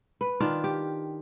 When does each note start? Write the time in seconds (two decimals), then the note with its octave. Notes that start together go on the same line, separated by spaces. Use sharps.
0.21 B4
0.40 D#3 D4 F4
0.64 G4